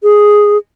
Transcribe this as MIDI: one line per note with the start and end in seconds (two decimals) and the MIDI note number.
0.03 0.57 68